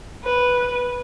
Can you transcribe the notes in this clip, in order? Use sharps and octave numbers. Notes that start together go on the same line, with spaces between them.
B4